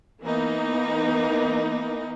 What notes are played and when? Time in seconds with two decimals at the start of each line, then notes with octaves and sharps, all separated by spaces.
0.22 E3 A#3 B3 D#4